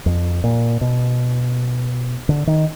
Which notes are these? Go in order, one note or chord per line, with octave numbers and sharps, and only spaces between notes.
F2
A#2
B2
D3
D#3